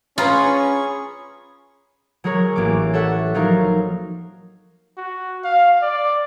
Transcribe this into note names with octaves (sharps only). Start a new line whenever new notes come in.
C#4 F4 G#4 B4 A#5 B5 C#6
F#3 G#3 G#4 A#4 C#5
A1 F#3 A#3 D6
A4 C#5 E5 F#5
F3 F#3 D#4 A#4 F5
F#4
F5
D5